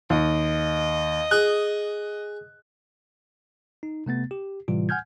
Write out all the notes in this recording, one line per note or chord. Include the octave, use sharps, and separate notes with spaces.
D#2 D#5
G#4 F#6
D#4
C3 A3 B3 A6
G4
A2 C3 E3 G3 F4
F#5 G#5 F6 G6 G#6